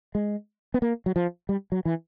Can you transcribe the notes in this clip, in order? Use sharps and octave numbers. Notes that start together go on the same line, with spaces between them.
G#3
B3
A#3
F#3
F3
G3
F#3
E3